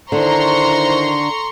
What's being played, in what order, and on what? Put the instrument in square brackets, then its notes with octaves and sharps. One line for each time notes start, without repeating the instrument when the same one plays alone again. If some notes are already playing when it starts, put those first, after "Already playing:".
[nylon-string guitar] D3 [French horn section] D#3 E4 C5 [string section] A#5 C6 C#6